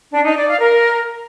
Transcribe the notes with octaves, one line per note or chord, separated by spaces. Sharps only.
D4
D#4
D5
F5
A#4